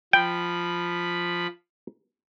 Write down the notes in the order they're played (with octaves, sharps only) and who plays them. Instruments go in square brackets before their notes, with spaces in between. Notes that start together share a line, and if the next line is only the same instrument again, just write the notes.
[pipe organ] F3 B5 [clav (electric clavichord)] G5